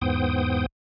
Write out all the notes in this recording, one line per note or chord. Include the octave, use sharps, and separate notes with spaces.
E2 G#2 B3 C5 G5 D#6